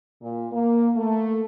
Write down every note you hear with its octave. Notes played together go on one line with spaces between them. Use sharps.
A#2
A#3
A3